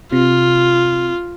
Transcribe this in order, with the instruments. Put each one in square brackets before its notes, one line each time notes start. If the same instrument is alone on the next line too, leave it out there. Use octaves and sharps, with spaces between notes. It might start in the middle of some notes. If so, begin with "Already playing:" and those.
[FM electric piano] C3 [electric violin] F4